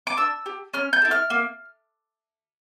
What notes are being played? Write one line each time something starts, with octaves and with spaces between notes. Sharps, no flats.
D6
D4 E6
G4
C#4 F6
G6
E4 A4
F6
A#3